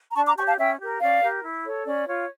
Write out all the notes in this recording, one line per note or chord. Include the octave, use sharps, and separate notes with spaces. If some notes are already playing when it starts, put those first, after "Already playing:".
A#5
D4 A5 C#6
A#5 D6
G4 C#5 A5 C#6
F5 A5
C#4 E5 G5
G4 A#4
C#4 D5 F5
G4 A#4
E4
A4 C#5
C#4 D5
F4 C#5